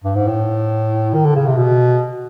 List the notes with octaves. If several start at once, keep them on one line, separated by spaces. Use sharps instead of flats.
G2
G#2
A2
D#3
D3
C#3
C3
B2